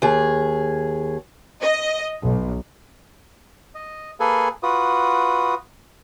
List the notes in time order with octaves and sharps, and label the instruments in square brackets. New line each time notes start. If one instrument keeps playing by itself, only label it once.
[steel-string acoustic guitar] D#2 G#4
[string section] D#5
B1
[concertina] D#5
A#3 G#4 A4 B4 G#5
F4 F#4 B4 D#6